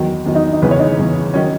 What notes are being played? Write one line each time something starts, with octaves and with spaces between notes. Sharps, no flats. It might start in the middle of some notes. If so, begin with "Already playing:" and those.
Already playing: E2 D#3 F#3
E2 D#3 F#3
D#4
D#4
E2 C#3 E3 B4
C#5
D#4
E2 C#3 E3
D#3 F#3 C#4